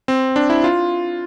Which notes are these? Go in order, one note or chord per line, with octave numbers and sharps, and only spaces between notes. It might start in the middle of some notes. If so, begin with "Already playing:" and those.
C4
D4
E4
F4